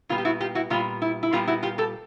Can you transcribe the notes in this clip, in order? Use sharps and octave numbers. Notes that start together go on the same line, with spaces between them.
A#2 G3 B3 F4
G4
E4 F#4
F4 G4
E4 F#4
A#2 G3 B3 F4
E4
E4
A#2 G3 B3 F4
E4 F#4
F4 G4
G4 A4